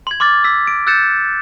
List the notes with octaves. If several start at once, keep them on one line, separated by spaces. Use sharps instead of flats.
C6 G#6
C6 D6 F6 A6
E6 B6
D7
E6 F#6 G6 A6 C#7 E7